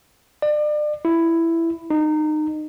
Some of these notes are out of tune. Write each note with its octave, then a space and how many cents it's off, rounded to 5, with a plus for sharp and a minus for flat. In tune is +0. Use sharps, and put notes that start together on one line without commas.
D5 +35
E4 +10
D#4 -25